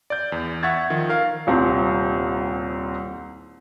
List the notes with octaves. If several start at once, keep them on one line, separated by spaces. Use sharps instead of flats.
D5 G6
E2
E5 F#5 C#6 G#6 A6
D#3 F3
A#4 F5
D#1 C2 C4